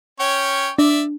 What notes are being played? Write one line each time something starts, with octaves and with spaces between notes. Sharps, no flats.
C#4 C#5 G5
D4 D5 E5